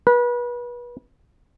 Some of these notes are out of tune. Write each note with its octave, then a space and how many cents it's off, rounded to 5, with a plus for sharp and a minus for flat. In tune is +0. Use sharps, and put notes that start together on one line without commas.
B4 -30